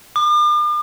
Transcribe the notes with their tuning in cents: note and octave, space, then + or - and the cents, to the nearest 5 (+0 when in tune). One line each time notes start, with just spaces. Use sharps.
D6 +45